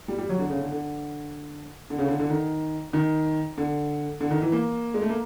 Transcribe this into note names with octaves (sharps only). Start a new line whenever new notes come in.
G3
G3
F#3
D3
C#3
D3
D3
D3
C#3
D3
D3
D#3
D#3
D3
D3
D#3
E3
A#3
G#3
A3
A#3